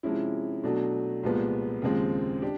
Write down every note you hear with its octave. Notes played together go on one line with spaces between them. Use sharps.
C3 F3 G#3 C#4 E4
B2 F#3 A3 D4 F#4
C2 A#2 F3 G#3 B3
D#2 C#3 F3 G#3 C4
D4 G4